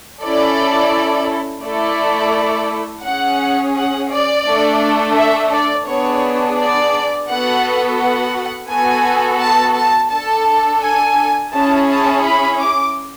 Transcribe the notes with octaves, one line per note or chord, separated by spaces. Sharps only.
C#4 E4 A4 D5
A3 E4 A4 D5
C#4 G#4 F#5
F#5
D5
A3 D4 A4
E5
D5
B3 D4 G#4 C#5
D5
B3 F#4 A4 F#5
F#5
B3 F#4 A4 G#5
A5
A5
D4 A4 A5
G#5
C#4 E4 G#4 A5
A5
B5
D6